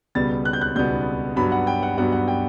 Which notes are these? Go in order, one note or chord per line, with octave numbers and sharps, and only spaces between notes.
C#2 B2 G3 B3 A6
F#6
G6
F#6
C#2 B2 G3 B3 G6
G2 F#3 B3 B5
F#5
G5
F#5
G2 F#3 B3 F#5
F#5
G5